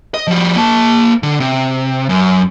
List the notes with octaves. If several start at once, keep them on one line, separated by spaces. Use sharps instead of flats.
D#5
F3 G3
A#3 A5
D3
C3
F#2